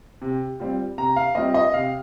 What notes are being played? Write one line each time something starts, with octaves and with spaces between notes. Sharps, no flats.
C3
G3 C4 F4
C3 A#5
F5
G3 C4 F4 D#5
D#5
C3 F5